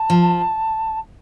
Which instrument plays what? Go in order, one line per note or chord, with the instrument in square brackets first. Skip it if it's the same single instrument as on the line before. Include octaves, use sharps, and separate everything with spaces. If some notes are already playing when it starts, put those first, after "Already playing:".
Already playing: [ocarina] A5
[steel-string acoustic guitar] F3